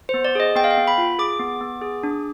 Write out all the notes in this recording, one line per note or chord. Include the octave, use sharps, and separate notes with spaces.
B3 C5
D5
G#4 D#5
B3 G5
F5
G5
B3
B5
F4
G#4 D6
B3
B3
G#4
D4